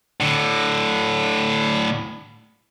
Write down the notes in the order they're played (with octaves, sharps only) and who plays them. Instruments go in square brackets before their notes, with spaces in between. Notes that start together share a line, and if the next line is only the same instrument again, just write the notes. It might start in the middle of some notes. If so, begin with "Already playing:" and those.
[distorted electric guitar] A2 D3